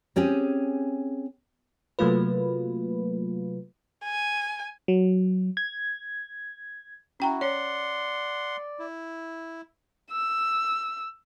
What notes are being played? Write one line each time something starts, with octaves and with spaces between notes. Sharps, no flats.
C4 C#4 G4 G#4
C3 F#3 A3 A#3 F4 B4
G#5
F#3
G#6
C#4 E4 F#4 G5 A#5
C#5 D5 F#5 C6
E4
E6